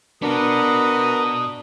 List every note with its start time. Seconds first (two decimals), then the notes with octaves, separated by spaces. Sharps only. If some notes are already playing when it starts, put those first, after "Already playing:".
0.22 B2 B3 D4 F#4 A#4 B4 D#6